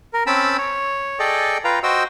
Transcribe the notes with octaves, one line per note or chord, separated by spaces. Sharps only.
A#4
C4 C#4 G5 A5 B5 E6
C#5
G#4 A4 D5 D#5 G5
F4 B4 F5 G5 A#5
F#4 C5 D#5 G5 E6